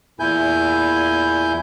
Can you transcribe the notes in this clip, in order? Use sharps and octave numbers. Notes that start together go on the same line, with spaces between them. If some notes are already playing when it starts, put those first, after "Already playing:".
E2 A#2 E4 G#5 G6